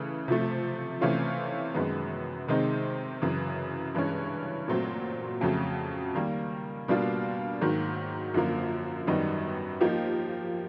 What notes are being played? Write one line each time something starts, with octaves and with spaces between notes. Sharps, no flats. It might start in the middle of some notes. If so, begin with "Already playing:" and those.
Already playing: C#3 E3 A3
C3 F3 A3
C3 E3 A3 C#4 F4
F#2 D#3 G#3 B3
C3 D#3 G#3 C4 D#4
F#2 C#3 E3
G2 E3 G#3 C#4
A#2 F#3 A3 C4
F2 C#3 F#3 A3
D#3 G3 A#3
B2 G3 A#3 D4 F4
G#2 D#3 F#3 A#3
F#2 D3 F3 A#3
F#2 D#3 G3 B3 D#4
F3 A#3 D#4 G4